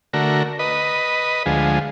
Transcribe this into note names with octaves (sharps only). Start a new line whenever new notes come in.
D3 A3 F#4 A#4
B4 D#5
D2 F3 G#3